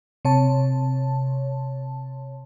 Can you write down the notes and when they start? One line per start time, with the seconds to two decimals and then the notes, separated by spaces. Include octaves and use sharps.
0.25 C3 C#5 A5